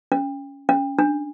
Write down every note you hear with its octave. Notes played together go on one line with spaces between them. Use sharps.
C#4
C#4
D4